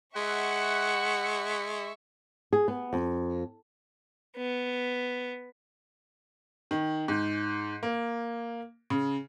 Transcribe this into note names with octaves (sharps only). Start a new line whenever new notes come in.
G#3 E5 F#5 C#6
G#4
B3
F2
B3
D#3
G#2
A#3
C#3